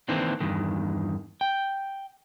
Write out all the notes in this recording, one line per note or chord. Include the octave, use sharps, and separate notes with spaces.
D#3 E3 A#3 C4 D4
E2 G2 D#3
G5